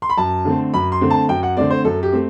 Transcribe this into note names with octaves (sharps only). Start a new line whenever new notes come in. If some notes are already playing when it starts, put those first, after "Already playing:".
C6
B5
F#2 A5
D3 A3 C4
F#2 B5
C6
D3 A3 C4
A5
F#2 G5
F#5
D3 A3 C4 D5
C5
F#2 A4
G4
A3 C4